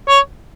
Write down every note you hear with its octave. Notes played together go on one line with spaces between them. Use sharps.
C#5